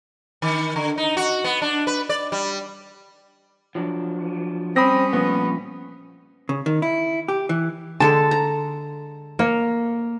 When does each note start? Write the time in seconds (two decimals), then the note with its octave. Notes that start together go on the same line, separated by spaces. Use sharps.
0.42 D#3
0.76 D3
0.98 D#4
1.17 F#4
1.44 B3
1.62 D4
1.87 B4
2.09 D5
2.32 G3
3.75 F3 F#3 D4
4.76 G3 C4 C#4 B5 D#6 A#6
5.13 A#2 F3 A3 B3
6.49 C#3
6.66 D#3
6.82 E4
7.28 G4
7.49 E3
8.00 D3 G#3 A4 A5
8.31 A#5
9.39 A#3 C#5